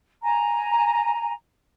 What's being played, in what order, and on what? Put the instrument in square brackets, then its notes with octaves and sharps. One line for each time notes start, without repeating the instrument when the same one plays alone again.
[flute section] G#5 A#5